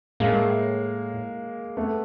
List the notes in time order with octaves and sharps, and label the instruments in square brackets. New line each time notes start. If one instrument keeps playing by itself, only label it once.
[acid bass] A2 [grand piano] G#3 A#3
[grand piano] A3 B3